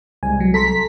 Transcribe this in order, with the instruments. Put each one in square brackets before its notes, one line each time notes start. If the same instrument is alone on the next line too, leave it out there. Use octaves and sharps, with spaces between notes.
[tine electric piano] C2 G#3 [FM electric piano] G#5
[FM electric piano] F#3
[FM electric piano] A4 A#5 C6 [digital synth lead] B6